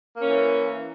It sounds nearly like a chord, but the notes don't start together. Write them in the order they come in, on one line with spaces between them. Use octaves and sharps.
A#3 C#4 E3